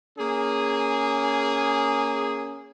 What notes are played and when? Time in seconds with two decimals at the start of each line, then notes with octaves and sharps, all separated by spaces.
0.19 A#3 C#4 G#4